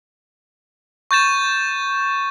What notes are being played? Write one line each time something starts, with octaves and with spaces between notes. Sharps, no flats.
C#6 G6 A6 E7